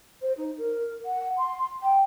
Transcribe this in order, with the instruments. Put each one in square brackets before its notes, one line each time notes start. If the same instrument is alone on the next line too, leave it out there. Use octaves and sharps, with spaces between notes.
[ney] C5
D#4
A#4
F#5
C6
G5